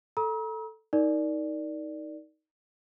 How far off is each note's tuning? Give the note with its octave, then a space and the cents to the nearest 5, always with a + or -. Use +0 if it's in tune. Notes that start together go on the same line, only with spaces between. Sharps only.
A4 +0 A#5 +40 E6 -45
D#4 +15 A#4 +0 D5 +0